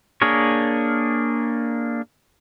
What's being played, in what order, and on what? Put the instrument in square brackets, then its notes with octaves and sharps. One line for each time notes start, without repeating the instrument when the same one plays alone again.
[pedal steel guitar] A#3 D4 G#4 A#4 C#5